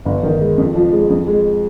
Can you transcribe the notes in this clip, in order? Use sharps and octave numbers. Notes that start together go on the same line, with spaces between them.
G1
D#3
G#3
F2
F3
G#3
F2
G#3